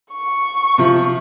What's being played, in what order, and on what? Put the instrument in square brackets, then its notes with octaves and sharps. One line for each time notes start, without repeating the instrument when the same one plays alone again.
[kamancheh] C#6
[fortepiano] C3 F3